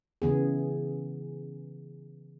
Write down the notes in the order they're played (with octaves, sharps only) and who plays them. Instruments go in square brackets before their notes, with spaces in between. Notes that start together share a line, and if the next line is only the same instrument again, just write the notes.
[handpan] C#3 E3 B3 G#4